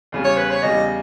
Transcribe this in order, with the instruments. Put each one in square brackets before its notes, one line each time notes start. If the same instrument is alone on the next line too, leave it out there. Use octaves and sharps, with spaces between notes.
[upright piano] E2 C#3 G3
[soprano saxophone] C#5
B4
C#5
[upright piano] E2 C#3 G3 [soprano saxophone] D#5